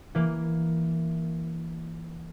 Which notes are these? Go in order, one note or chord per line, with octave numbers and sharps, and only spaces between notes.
E3 A#3